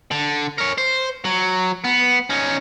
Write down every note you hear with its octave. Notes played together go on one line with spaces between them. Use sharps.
D3
A#4 C#5
C5
F#3
B3
C#4 D#4